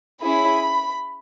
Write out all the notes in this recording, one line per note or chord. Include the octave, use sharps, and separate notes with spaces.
C#4 E4 G#4 B5